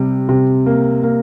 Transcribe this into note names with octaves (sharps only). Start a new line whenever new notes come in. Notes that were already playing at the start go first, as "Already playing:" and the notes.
Already playing: C3 G3
C3
A#3
A#3